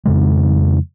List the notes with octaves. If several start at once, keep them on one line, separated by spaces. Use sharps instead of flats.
F2 C#3 G#3